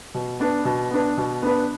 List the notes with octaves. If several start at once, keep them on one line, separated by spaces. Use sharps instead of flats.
B2
B3 D4 B4
B2
B3 D4 B4
B2
B3 D4 B4